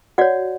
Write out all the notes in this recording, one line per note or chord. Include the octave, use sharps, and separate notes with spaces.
F#4 C#5 D5 F#5